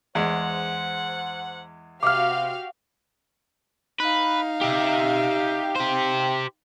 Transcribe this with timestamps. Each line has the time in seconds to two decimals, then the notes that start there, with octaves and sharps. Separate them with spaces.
0.15 E2 G#3 C5 F#5
2.03 C3 F#4 G4 F5 D6 F6
4.00 D#4 B4 F5
4.61 G4 E5
5.76 G4 C5